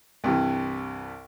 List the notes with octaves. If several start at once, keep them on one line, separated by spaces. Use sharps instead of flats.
C2 G2 E3